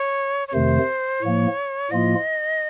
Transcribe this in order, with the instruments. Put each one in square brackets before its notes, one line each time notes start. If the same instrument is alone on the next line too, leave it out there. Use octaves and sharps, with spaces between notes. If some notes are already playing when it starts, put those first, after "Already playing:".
Already playing: [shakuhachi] C#5
C#5
[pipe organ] F2 C3 D#3 A3 [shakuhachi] C5
[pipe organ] A2 F3 A#3 [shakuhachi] C#5
[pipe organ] A2 F3 A#3 F4 [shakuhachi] D#5